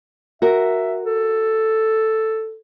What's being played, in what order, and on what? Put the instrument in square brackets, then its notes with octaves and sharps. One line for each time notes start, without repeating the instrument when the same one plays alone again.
[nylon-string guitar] F#4 A#4 [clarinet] E5
[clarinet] A4